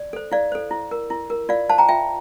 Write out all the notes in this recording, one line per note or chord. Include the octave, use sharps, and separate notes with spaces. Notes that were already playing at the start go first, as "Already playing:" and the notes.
Already playing: D5
A4 C5
E4 D5 F5
A4 C5
E4
A#4
E4
A#4
F4 D5 F5
C5 F5 A5
G5 A#5
F4 E5 G5